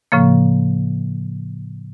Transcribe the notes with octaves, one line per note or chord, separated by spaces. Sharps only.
A2 C#3 F3 A#3